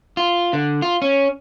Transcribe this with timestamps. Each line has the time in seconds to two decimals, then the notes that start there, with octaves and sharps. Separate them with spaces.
0.17 F4
0.53 D3
0.82 F4
1.02 C#4